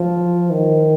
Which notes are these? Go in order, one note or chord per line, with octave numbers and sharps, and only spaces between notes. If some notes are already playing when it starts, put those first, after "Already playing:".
Already playing: F3
D#3